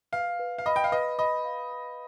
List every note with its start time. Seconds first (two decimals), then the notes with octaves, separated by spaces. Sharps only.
0.12 B4 F5
0.39 B4
0.58 F5
0.66 D#5 B5
0.76 G5
0.84 F5
0.92 B4 D#5
1.19 D#5 B5
1.45 F5
1.71 B5